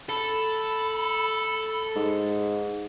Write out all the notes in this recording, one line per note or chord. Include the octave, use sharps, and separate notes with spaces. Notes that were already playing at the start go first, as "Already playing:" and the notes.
A4 B5
G#2